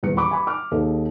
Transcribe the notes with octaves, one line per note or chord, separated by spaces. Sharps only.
D#1 E2 C#7
B5 C#6 D6
G#5 B5 D6
D6 F6
D#2 G#4 A4 D#5